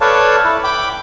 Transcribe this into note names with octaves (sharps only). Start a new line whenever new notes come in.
A4 B4 C#5 D5 F5 A5
E4
G5 B5 D6